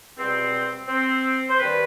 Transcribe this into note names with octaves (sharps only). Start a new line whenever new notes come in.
E2 B2 G3 C4
C4
C5
G2 D#3 G3 B4